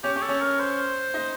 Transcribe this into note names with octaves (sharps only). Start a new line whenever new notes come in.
C#4 G4 C#5
C#4 C#5
A4
C#4 C#5
A#4
C5
D#4 D#5